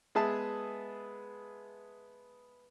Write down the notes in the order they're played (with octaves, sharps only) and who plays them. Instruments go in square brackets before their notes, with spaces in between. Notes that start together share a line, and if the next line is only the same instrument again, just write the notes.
[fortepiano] G#3 B3 G#4 E5 A5